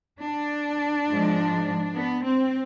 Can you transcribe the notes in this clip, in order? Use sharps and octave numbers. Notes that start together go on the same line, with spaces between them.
D4
G#2 F3 G#3
B3
C4